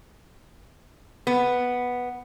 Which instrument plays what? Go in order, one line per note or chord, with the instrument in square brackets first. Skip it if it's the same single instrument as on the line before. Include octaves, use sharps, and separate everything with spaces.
[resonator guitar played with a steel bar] B3